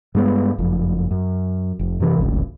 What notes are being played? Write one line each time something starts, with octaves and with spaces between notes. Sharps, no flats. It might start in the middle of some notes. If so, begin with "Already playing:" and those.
G2 G#3 B3
F#1 F2
F#2
F1
F#2 C3 E3
D1 G#1 C#2